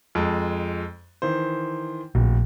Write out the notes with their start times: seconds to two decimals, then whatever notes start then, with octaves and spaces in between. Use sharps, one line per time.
0.15 F2 G#3 A5
1.22 D#3 E3 C5
2.15 D1 A#1